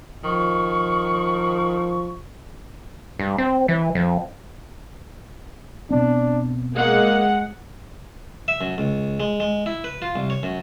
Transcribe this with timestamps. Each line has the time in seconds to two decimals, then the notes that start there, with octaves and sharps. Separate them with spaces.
0.24 D#3 F3 C#6
3.19 G2
3.38 C4
3.68 E3
3.95 F2
5.90 B2 B3 C4 D4
6.75 G#3 A#3 F#5
8.48 E5
8.61 F#2
8.78 C#2
9.20 G#3
9.40 G#3
9.66 E4
9.84 B4
10.02 F4
10.16 C2
10.30 C#5
10.43 F#2